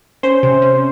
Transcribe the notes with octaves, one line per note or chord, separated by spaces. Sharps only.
C#4 C5
C3
C#4